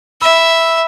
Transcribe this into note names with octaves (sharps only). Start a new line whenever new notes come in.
E5 B5 E6